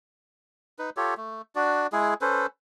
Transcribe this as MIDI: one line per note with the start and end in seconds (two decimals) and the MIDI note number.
0.79 0.90 63
0.79 0.90 71
0.97 1.14 65
0.97 1.14 67
0.97 1.14 69
0.97 1.14 73
1.17 1.42 57
1.55 1.87 62
1.55 1.87 66
1.55 1.87 74
1.92 2.14 56
1.92 2.14 64
1.92 2.14 68
2.21 2.46 61
2.21 2.46 69
2.21 2.46 71
2.21 2.46 72